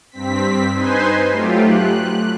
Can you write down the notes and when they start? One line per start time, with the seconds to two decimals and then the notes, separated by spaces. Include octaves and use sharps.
0.11 G2 C4 B6
0.75 D#4 B4 C5 G#5 C6
1.30 F#3 A3 F4 G4
1.61 F#6